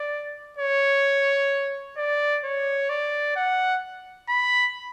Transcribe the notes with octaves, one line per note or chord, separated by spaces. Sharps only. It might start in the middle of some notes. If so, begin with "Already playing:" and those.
Already playing: D5
C#5
D5
C#5
D5
F#5
B5